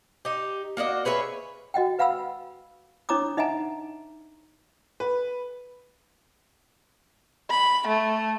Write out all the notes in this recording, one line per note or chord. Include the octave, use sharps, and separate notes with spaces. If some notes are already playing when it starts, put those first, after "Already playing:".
D#4 G4
A#3 F#4 D5 D#5
G#4 B4 C#5 E5
F#4 D#5 F#5 G5
B4 F5 F#5 B5 E6
D4 E4 C#5 A#5 D6 D#6
D#4 D#5 E5 F#5 G#5 A#5
B4
B5
A3